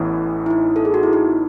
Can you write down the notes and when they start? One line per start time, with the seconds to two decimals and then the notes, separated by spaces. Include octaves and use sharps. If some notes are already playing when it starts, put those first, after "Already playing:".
Already playing: A1 A2 E3 B3 E4
0.46 E4
0.50 D#4
0.76 A4
0.85 G#4
0.94 F#4
1.03 E4
1.13 D#4